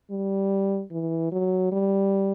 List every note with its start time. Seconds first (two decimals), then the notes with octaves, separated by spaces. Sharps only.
0.11 G3
0.91 E3
1.32 F#3
1.72 G3